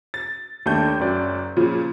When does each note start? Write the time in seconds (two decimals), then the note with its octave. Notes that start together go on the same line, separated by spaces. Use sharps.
0.14 A6
0.66 D#2 A3 D4 G6
1.00 F#1 F#2 D5
1.57 A#2 C#3 F3